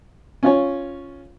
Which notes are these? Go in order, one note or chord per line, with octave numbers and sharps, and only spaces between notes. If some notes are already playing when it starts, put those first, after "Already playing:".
C#4 F4 C#5